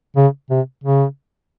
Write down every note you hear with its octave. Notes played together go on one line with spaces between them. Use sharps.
C#3
C3
C#3